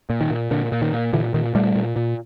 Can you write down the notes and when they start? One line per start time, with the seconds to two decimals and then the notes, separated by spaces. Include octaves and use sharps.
0.10 A#2
0.21 D#3
0.30 A#2
0.51 A#2 D3
0.72 A#2
0.82 D#3
0.93 A#2
1.13 A#2 D3 E3
1.34 A#2 D#3
1.55 A#2 G3 A3
1.75 A#2
1.96 A#2